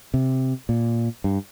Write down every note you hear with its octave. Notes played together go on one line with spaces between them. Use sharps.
C3
A#2
G2